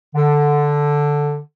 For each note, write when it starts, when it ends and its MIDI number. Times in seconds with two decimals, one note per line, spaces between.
0.15 1.39 50